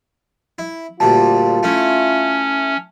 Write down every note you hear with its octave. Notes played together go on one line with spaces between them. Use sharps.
E4
D2 A#2 G3 F4 A5
A3 C#4 E4